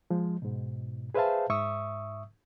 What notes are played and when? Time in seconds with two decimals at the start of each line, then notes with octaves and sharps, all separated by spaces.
0.10 F3 G#3
0.42 G#2 B2
1.14 G#4 B4 C5 E5 F5 A5
1.49 G#2 E5 C#6 D#6 E6